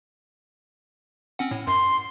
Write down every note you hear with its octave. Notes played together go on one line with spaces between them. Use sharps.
C4 C#4 F#5
A2
F#2 C6